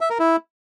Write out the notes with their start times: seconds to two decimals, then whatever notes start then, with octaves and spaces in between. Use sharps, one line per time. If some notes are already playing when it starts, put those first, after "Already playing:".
0.01 E5
0.10 A#4
0.19 E4